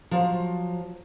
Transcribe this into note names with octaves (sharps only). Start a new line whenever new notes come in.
F3 F#3 C5